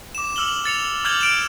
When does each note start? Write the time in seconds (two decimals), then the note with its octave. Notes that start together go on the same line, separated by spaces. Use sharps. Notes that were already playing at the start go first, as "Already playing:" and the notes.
0.15 D6 E7
0.36 D6 E6 F6 F#7 G7
0.65 A6 C#7 F7
1.04 D6 F6 G6 G#6 F#7 G7
1.21 F6 D7 E7